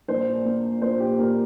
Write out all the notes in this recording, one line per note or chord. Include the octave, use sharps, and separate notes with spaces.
A#1 C5
A#3
A#2 C5
G4
A#2 A#4